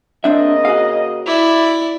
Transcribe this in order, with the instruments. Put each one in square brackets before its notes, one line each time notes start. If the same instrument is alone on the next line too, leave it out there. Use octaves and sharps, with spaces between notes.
[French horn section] C#3 A#3 D#5 [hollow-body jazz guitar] C4 D4 E5
[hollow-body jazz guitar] F#4 G#4 F5
[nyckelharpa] E4 D5